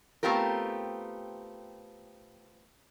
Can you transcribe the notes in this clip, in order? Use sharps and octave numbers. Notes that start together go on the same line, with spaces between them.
A3 B3 C4 F4 G4 A#4